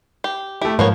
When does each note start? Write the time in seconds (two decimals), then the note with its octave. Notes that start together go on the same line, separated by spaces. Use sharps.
0.24 G4
0.62 A3 E4 G4
0.79 G#2 F3 A#3 B3 C#5